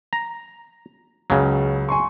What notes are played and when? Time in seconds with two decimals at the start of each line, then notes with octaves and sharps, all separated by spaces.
0.13 A#5
1.30 C#2 C#3 F#3
1.89 G#5 C6 C#6